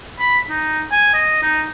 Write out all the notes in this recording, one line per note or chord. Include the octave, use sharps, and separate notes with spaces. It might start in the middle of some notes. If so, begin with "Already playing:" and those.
B5
D#4
G#5
D#5
D#4